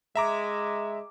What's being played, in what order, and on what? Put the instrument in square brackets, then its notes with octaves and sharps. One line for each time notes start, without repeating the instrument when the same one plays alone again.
[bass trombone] G#3 [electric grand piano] E5 A#5 D6